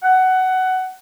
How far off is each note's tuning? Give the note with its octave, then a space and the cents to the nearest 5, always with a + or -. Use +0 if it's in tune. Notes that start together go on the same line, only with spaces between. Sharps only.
F#5 +15